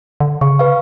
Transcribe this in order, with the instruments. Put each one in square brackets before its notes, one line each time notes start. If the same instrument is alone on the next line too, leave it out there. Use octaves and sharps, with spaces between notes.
[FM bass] D3
[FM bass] C#3 [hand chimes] C#6
[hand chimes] B4 F5